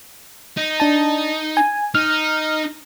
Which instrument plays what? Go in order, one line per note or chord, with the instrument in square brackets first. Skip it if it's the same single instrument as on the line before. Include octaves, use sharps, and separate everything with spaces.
[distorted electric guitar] D#4
[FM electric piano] D4 A5
G#5
[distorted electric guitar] D#4 [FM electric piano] F6